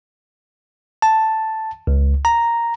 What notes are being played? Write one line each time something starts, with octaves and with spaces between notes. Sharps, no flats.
A5
C#2
A#5